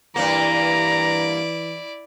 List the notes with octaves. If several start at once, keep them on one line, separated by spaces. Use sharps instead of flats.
G2 E3 A#3 E4 D5 A#5